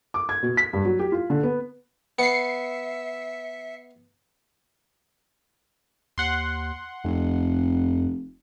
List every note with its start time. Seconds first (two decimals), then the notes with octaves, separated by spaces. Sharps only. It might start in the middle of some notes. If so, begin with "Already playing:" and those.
0.14 D6
0.29 G#6
0.43 B2
0.57 B6
0.73 G2
0.85 F#3
0.99 G4
1.12 F4
1.30 D3
1.43 B3
2.19 B3 E5 C7 C#7
6.18 D#2 F#5 C6
7.05 F1 F2